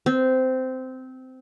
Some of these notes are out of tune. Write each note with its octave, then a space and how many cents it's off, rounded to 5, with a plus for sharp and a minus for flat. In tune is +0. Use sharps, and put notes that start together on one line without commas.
C4 -15